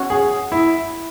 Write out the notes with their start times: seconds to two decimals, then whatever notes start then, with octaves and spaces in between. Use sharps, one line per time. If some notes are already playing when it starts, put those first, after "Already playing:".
Already playing: C#4 F#4 C#5
0.10 G#4
0.52 E4